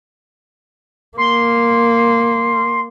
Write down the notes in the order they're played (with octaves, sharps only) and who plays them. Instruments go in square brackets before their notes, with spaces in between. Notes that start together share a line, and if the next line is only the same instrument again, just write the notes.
[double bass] A#3 [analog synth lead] C6